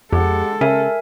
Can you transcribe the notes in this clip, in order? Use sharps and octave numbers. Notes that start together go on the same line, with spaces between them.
F2 G#3 G4 A4 F#5
C#3 A#4 E5 G#5